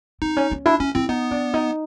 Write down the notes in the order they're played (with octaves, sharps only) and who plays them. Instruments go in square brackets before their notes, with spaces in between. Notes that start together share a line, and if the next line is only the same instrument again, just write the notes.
[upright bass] C4 [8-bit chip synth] D#4
[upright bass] C#4
C#4
[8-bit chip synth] D4 [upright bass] E4
[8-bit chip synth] C#4 [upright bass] E4
[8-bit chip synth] C4 [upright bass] E4
[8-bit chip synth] B3 [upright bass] D#4
[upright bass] D4
D#4